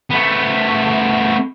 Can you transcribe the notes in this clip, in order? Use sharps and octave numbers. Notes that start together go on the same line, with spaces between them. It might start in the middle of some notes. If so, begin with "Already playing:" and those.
A3 B3